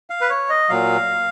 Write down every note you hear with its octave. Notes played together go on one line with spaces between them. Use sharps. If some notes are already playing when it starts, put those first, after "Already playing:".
F5
B4
C#5
D#5
A#2 F#3 F5